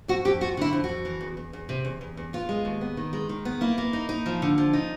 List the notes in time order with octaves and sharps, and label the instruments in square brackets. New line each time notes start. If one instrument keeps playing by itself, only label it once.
[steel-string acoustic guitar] F2 F#4
F2 G4
F3 F#4
D3 E4
F2
F#4
F2
E3
E2
E2
E2
C3
E2
E2
E2
B3 F4
G#3
D#2
B3
D#3
G#3
D#3
B3
A#3 E4
A#3
D#4
D#4
F3
D3
F3
D#4